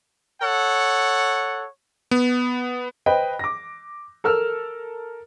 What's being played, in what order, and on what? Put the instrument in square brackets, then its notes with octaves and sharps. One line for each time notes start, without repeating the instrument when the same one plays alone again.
[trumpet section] A4 C#5 F#5
[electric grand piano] B3
[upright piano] B4 C5 D#5 G5
D6 A#6
A4 A#4 E6 F6